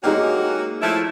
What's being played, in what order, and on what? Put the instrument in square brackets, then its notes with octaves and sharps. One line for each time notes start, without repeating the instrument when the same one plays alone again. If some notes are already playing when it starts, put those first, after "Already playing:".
[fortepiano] G#3 D#4 G4 [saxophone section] A#3 C#4 F#4
[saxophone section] F3 A3 E4